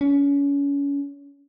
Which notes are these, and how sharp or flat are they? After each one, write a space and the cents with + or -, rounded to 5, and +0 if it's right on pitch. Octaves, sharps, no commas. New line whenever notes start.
C#4 +30